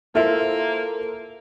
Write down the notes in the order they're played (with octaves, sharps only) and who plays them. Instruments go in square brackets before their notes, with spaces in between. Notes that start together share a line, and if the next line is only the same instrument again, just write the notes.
[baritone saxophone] A#3 [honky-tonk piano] E4 C5 [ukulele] F4 E5 [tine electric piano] A4 A#4